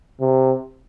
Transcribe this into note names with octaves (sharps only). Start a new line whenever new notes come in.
C3